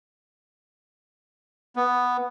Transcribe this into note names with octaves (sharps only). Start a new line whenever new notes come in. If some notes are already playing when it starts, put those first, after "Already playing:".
B3